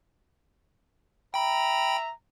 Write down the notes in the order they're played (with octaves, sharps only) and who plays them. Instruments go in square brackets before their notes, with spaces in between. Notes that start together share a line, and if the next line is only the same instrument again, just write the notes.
[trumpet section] E5 A#5 [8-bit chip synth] G5 B5